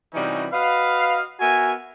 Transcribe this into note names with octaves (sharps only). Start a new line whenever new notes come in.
C3 E3 G3 C#4 D#4 F#4
F#4 B4 D#5 F5
B3 F#4 A#4 E5 G#5